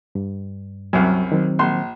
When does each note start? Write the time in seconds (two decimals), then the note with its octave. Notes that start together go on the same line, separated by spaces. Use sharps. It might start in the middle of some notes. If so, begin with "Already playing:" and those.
0.15 G2
0.93 C2 F#2 F#3
1.32 D#3 F#3 C4
1.59 A#1 C6